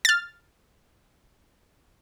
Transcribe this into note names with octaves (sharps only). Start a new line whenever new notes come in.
F6 A6